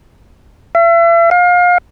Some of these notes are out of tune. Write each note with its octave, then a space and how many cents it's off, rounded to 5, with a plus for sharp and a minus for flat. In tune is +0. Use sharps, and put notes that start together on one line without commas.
E5 +40
F5 +30